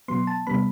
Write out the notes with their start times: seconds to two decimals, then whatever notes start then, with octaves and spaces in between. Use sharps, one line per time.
0.08 B2 F#3 B3 C6
0.27 A5
0.47 C3 G3 B3 B5